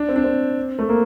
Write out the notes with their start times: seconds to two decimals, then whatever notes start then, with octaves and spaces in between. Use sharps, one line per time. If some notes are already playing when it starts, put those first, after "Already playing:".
Already playing: D4
0.09 C4
0.16 D4
0.24 C4
0.79 A3
0.89 A#3